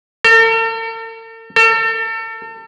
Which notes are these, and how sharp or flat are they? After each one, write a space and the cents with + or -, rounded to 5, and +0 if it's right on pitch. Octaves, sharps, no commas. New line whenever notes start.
A4 +45
A4 +35